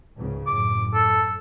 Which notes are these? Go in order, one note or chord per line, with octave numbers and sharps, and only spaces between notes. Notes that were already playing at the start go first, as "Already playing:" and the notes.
C#2 G#2 C#3
F#2 A2 D6
A4